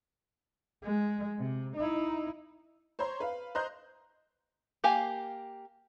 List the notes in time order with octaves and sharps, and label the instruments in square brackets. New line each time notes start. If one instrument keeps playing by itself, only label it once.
[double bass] G#3
C3
D#4 E4
[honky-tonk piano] C5 C#5 A#5 C6
B4 F5
C5 D#5 A#5 C6 F#6 G6
[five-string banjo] A#3 G4 F5 G#5